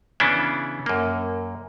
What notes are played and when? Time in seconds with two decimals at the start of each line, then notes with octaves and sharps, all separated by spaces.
0.20 C#3 E3 B3 C#4 D4 E4
0.86 F#2 A#3